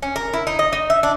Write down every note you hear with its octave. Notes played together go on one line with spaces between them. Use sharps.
C#4
A#4
E4
D#4
D#5
D#4
E5
D4